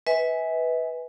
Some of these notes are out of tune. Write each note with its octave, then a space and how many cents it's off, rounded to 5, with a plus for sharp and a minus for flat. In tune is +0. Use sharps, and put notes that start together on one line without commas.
B4 +0 E5 -40 G#5 +0